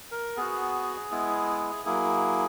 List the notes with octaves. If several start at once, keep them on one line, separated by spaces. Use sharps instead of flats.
A#4
B3 F#4 G#4
G#3 B3 E4
F#3 A#3 E4 G#4